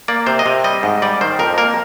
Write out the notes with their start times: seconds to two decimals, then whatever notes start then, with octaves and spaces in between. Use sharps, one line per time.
0.08 A#3 D5
0.26 C3 C5
0.39 D#5
0.46 C3
0.64 G3 D#5
0.83 G#2
1.02 G3 D5
1.21 D#3 C5
1.39 F2 A#4
1.58 A#3 A#4